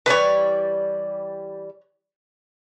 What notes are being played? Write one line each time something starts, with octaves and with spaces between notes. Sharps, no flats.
E3 G3 B4 C#5 D5